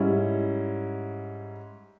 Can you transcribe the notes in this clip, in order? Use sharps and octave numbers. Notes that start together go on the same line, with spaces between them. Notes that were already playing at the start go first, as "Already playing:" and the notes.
Already playing: G#2 G3 C#4 E4